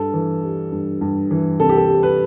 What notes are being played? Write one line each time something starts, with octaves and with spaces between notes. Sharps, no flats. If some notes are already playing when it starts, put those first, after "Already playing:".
Already playing: G2 A4
E3
G3
G2
G2
E3
C3 A4
G4
A4
G3
B4